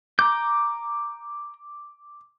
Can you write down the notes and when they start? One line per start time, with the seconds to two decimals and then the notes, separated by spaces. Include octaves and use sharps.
0.19 A#5 D6 G6